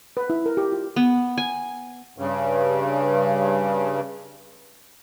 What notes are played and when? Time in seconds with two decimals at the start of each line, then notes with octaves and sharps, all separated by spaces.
0.17 B4
0.30 E4
0.46 A#4
0.57 G4
0.72 F4
0.96 B3
1.38 G#5
2.18 G2 C#3